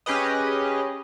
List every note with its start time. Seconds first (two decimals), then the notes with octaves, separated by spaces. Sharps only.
0.06 C#4 G4 G#4 B4 D#5